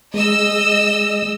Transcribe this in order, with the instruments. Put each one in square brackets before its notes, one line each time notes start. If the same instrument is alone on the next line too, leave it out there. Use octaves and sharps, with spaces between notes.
[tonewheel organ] G#3 [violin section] D#5 E6